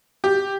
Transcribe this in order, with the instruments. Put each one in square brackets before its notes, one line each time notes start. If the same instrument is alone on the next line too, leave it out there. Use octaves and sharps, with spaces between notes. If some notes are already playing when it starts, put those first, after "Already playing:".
[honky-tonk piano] G4